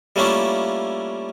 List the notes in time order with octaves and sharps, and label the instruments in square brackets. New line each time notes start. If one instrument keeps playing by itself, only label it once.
[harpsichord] G3 A3 A#3 C#4 E4 F4